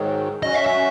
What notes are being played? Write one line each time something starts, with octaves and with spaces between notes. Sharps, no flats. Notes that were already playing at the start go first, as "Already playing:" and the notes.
Already playing: G#2 D#3 F#3
F#3 C#4 F#4 D#5
E5
E5